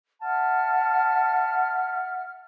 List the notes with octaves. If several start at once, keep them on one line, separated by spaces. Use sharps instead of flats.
E5 F#5 A5 F6